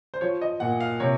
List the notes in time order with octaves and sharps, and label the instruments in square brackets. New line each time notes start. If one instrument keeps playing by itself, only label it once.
[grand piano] C5
F3 C#5
D#5
A#2 F#5
F5
C3 C#5